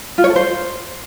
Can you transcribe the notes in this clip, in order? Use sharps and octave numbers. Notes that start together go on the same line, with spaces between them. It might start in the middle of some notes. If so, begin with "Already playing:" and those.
F4
C#5
A4
C5